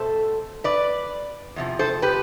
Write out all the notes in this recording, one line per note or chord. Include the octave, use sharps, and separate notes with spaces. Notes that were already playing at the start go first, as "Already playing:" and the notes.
Already playing: B2 A3 A4 C5
B4 D5
E2 C3 F3
A4 C5
G4 B4